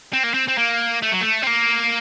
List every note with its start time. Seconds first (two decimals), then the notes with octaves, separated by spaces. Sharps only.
0.13 C4
0.24 A#3
0.34 C4
0.48 C4
0.58 A#3
1.02 A3
1.12 F#3
1.21 A3
1.43 C4
1.47 A#3